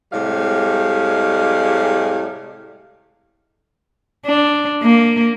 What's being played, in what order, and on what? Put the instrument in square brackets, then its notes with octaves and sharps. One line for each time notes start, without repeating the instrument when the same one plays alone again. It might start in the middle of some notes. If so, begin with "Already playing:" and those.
[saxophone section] A2 C3 G3 G#3 F5
[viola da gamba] D4
A#3